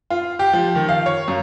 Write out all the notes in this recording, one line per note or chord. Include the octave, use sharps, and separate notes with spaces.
F4
G4
F3
D#3
F5
C#5
F#2